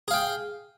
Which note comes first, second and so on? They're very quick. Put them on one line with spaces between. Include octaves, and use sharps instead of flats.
G#4 F5 G5